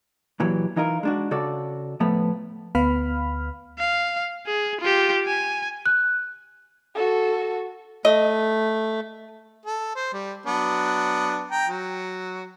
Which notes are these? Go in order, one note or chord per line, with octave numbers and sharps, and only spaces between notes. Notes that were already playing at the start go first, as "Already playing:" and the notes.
A#2 E3 F#3 G4
E3 D#4 F4 A#4
G#3 D4 F#4
C#3 F#4 A4 D5
A2 F3 A3 B3
D2 B3 F5 B5 F6
F5
G#4
F4 G4
G#5
F#6
F#4 A4
A3 D#5
A4
C5
G3
F#3 B3 D4
G5 A#5
F#3